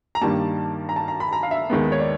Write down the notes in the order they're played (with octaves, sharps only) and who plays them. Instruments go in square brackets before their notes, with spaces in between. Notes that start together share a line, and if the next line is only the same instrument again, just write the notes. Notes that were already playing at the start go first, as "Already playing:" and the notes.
[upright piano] A#5
G2 D#3 G3 A#3 A5
A#5
A5
A#5
B5
A#5
F5
E5
D#2 D#3 G#3 B3
C#5
D5